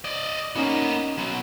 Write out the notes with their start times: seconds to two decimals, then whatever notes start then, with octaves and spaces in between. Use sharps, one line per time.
0.05 D5 D#5
0.56 A#3 B3 C#4 D#4
1.18 F#3 B3